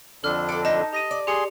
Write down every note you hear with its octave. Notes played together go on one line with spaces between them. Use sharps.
F2 D3 D4 A4 F6
A4 D5 D7
D#4 A5 A#6
G4 D#5 A#6 D#7
D5
G4 G#4 C6 C#7